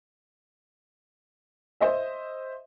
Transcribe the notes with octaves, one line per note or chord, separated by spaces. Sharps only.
C5 D#5 E5